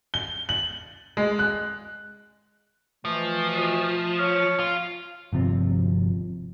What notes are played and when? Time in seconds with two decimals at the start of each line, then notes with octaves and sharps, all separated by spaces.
0.14 G7
0.49 F#7
1.17 G#3
1.39 F#6
3.05 B2 E3 F3 A3
4.19 C#5 C#6 F6
4.59 F4
5.33 G1 C3 F3 C4